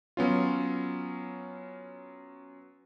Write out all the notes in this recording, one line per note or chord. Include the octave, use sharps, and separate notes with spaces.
F#3 B3 C#4 F4